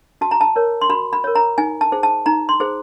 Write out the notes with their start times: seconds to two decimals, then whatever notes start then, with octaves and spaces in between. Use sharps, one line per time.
0.21 F#4 A5
0.31 A#5
0.41 A5
0.56 A#4 C#5
0.81 C6
0.89 F#4 B5
1.13 B5
1.24 A#4 C#5
1.35 A#5
1.58 D#4 G#5
1.81 A5
1.92 G#4 C5
2.03 A5
2.26 D#4 A#5
2.49 C6
2.60 G#4 C5